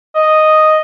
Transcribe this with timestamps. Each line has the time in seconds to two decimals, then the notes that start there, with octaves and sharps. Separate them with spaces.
0.15 D#5